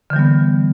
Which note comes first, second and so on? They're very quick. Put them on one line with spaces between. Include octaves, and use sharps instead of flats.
D3 E3 G3 B3